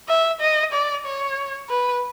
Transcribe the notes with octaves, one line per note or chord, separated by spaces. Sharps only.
E5
D#5
D5
C#5
B4